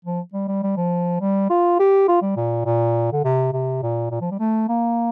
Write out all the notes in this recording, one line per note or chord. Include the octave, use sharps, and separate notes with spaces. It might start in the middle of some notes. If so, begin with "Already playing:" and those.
F3
G3
G3
G3
F3
G3
F4
G4
F4
G3
A#2
A#2
D3
C3
C3
A#2
A#2
F3
G3
A3
A#3